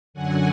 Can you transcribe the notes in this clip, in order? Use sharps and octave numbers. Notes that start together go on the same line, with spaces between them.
F#2 D3 F#3 F#5 G#5